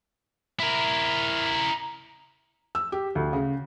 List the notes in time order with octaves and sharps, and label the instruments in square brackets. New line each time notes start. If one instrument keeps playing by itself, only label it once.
[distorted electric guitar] E4 A#4
[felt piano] E6
G4
D2
C#3